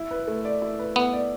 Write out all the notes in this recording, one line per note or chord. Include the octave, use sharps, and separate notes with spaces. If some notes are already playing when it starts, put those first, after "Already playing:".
Already playing: E4
B4
A3
D5
E4
B4
A3 B3
D5